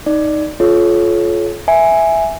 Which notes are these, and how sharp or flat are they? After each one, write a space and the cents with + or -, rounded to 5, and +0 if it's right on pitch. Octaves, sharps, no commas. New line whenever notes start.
D#4 +0 D5 +0
F4 +0 A4 -45 C#5 +0
E5 +0 G#5 +0